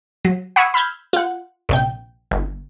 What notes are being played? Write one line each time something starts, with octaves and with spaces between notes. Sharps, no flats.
F#3
F#5 B5 C#6 D#6 E6 G#6
B5 E6 F6 G6 G#6
F4 F#5
A#1 C3 G5
G1